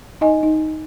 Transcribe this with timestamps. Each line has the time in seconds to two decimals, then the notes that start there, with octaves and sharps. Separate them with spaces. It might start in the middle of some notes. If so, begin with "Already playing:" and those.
0.21 D#4 D#5 G#5
0.43 D#4